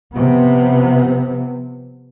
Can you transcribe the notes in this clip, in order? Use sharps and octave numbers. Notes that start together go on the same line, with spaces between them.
C3 F3 B3